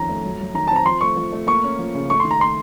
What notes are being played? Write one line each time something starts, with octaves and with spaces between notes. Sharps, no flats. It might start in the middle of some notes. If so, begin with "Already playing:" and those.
Already playing: F2 D#3 C#4 A#5
A3
F#3
F#3
D#3 A#5
C4 A5
A#5
F3 C6
A3 C#6
F3
A3
A#3 C#6
C#4
F3
C#3
A3 C#6
D#3 C6
A#5
A3 C6